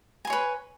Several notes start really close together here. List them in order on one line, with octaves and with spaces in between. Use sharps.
G#5 C6 C#5 B4